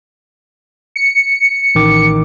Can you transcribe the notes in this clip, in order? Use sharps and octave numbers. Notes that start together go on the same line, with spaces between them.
C#7
A1 D#3 D6